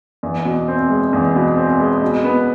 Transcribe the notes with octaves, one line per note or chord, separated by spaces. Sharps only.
E2
B2
C4
G#3
E2
B2
C4
G#3
B2
B3